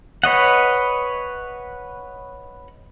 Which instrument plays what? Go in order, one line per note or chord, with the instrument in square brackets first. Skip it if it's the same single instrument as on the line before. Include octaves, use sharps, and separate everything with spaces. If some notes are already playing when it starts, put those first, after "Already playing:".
[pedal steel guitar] B4 C#5 D#5 F#5